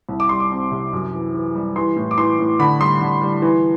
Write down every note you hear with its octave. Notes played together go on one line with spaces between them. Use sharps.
C2
D6
G3 C6
D6
C4
C3
F#2
E3
E3
G3
E3 C6
A2
D6
E3 C6
A2
D3 B5
G3 C6
D3
G3
E3